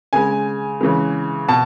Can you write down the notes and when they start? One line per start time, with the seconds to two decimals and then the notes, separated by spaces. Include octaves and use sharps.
0.13 C#3 G#3 G#5
0.81 C#3 E3 G#3
1.48 B2 A5